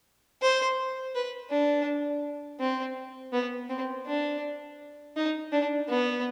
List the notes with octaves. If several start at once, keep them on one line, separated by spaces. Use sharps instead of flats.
C5
B4
D4
C4
B3
C4
D4
D#4
D4
B3